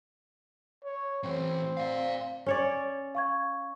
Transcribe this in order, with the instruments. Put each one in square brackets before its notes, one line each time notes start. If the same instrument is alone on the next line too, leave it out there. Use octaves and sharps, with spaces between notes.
[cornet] C#5
[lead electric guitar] A2 E3 [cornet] C4
[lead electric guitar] D5 F5
[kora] C#4 C#5 D5
[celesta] F5 C#6 G#6